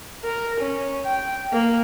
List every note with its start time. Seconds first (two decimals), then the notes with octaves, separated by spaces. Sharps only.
0.24 A#4
0.60 C#4
1.05 G5
1.52 A#3